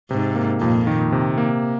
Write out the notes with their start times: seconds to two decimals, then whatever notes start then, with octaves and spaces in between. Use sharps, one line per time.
0.10 G#2 C3
0.35 A#3
0.61 F2 A#2
0.87 D#3
1.12 C3
1.38 A#3